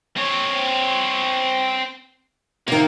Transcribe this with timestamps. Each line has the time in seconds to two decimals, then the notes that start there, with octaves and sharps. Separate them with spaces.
0.16 C4 C#5
2.68 C3 D#3 A#3